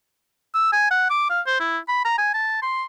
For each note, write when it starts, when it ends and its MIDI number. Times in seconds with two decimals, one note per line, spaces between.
0.55 0.72 88
0.73 0.89 80
0.91 1.09 78
1.10 1.27 86
1.30 1.41 77
1.47 1.59 72
1.60 1.78 64
1.88 2.02 83
2.05 2.18 82
2.18 2.29 80
2.34 2.60 81
2.62 2.84 84